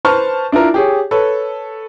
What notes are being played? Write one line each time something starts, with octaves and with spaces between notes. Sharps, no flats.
B4 C5 A5 C#6 F6
D4 E4 F4 A#4
G4 G#4 C#5
A4 B4 C#5